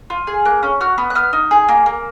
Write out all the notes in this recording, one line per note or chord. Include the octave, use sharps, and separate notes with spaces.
F4
G#4
A#3 F#6
C#4
F#4 F6
B3
F#6
B3 F6
D#4
G#4
A#3
A#3